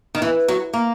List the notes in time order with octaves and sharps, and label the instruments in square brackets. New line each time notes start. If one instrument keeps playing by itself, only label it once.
[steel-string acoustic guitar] D#3
E3
F#3
A#3